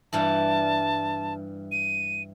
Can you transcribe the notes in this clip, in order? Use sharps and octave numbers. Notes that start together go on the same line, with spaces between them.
G2 E3 G3 A5
D#7